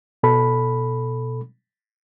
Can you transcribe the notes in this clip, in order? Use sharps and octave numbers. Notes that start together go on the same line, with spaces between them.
B2 A4 B5